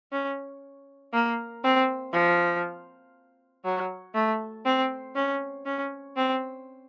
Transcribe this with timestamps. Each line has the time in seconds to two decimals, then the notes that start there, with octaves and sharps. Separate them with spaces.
0.12 C#4
1.13 A#3
1.64 C4
2.13 F3
3.65 F#3
4.15 A3
4.66 C4
5.15 C#4
5.66 C#4
6.16 C4